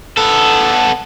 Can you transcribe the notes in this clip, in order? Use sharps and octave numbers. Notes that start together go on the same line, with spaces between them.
B3 A4